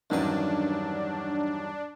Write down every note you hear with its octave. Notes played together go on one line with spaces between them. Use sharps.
E2 G2 D#3 F#3 C#4 D4 B4